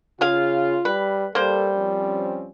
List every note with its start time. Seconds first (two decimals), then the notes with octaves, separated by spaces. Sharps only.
0.21 C#3 F4 G#4 F5
0.85 G3 B4
1.35 G3 A#3 A4 C5
1.76 F3 C4 C#4